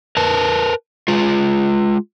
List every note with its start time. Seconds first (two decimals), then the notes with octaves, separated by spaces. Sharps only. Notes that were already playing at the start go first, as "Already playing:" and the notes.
0.17 A#4 B4 A5
1.08 G#3 F4